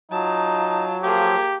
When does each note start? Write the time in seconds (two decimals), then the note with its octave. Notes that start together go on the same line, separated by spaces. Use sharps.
0.11 F#3 D#4 F4 A5
1.03 F3 A#3 G4 G#4